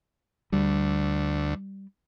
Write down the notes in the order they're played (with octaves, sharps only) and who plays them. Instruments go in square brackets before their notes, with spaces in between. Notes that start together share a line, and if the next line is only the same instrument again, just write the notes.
[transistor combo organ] D2 [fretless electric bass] G3